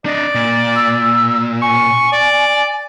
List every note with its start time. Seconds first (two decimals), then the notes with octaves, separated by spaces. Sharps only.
0.06 D4 D5 D#5
0.35 A#2
0.75 E6
1.62 G#5 C#6
2.12 D5